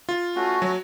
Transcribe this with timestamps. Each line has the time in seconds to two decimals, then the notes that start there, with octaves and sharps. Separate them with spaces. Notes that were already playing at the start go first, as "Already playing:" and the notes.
0.09 F4
0.35 A3 C#4 F#4
0.62 F#3